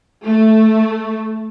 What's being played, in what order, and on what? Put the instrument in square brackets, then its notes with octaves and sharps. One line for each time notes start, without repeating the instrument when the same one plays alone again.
[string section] A3